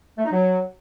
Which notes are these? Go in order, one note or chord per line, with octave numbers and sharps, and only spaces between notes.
A3
D#4
F#3